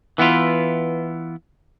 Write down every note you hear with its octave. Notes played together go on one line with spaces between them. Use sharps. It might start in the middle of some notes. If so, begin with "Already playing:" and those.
E3 B3 E4 F4